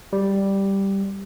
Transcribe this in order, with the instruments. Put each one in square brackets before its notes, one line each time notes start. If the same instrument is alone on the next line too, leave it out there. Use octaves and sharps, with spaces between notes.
[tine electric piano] G3